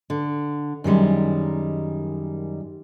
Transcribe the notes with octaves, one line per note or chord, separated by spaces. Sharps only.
D3
F#2 D#3 G3 G#3